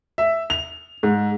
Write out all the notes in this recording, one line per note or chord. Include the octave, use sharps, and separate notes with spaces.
E5
F7
G#2